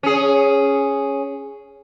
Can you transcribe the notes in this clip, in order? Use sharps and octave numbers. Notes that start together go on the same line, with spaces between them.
C#4 G#4